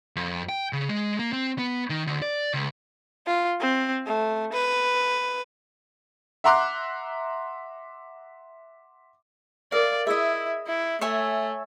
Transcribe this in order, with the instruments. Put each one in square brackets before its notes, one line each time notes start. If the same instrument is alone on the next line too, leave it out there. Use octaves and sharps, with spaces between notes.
[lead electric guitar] F2
G5
C#3
G#3
A#3
C4
B3
D#3
D2
D5
C#2
[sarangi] F4
C4
A3
B4
[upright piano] E5 F#5 A#5 C6 D6 F#6
[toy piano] A4 A#4 E5 [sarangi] D5 [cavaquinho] F5
[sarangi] E4 [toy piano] G#4 E6 [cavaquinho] D#5 E5
[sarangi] E4
[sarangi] A3 [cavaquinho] C#5 E5 G#5